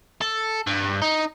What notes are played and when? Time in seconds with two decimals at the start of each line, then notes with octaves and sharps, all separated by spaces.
0.21 A4
0.67 G2
1.02 D#4